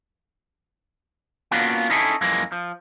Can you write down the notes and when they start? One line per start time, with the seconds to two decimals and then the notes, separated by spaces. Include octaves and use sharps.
1.51 A#3 B3 C#4 D4 F4 F#4
1.90 C#4 D#4 E4 G#4 A4
2.21 F#2 E3 F3 G#3 A#3
2.52 F3